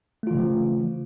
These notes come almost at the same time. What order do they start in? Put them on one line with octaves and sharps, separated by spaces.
A3 F4 E3 C#3 F3